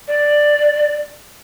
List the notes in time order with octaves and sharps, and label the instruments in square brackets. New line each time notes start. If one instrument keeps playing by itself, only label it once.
[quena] D5